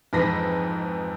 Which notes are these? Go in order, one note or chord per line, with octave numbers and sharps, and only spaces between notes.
F2 G#2 E3 B5 A#6 B6